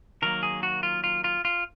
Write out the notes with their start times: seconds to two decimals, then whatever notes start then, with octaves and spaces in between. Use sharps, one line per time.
0.22 D#3 F#3 A#3 A#4
0.43 G#4
0.63 F#4
0.83 F4
1.04 F4
1.24 F4
1.45 F4